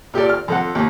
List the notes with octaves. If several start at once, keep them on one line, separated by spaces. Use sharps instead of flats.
A#2 G4 A4 D5
F6
F2 A4 F#5
D#2